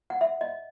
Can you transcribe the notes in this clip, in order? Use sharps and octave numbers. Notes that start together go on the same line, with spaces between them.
F#5
E5
D#5